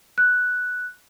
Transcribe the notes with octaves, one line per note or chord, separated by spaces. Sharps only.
F#6